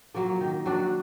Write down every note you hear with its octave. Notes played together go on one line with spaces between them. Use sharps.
F#3 A#3 F4
D#3
F#3 D4 F#4